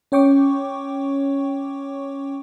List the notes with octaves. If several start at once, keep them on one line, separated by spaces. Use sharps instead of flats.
C#4 C#5 G5 C#6 D6